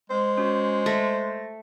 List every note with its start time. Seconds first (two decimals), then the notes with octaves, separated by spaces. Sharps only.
0.10 G#3 C5
0.38 C#4 F#4
0.86 A3 A6 A#6